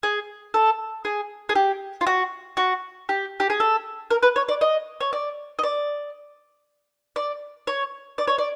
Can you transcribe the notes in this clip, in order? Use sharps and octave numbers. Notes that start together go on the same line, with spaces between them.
G#4
A4
G#4
G#4
G4
F4
F#4
F#4
G4
G4
G#4
A4
A#4
B4
C#5
D5
D#5
C#5
D5
D#5
D5
D5
C#5
D5
C#5
D5